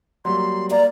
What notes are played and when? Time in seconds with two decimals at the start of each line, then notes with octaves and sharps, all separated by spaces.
0.25 F#3 G3 A#3 C6
0.71 A#3 D5 A#5